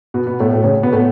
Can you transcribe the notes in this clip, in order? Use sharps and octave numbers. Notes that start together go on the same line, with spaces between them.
B2 B3
B2 B3
A2 A3
A2 A3
C#3 C#4
B2 B3
A2 A3